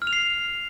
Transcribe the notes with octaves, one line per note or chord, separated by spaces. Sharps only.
F6
F7
C7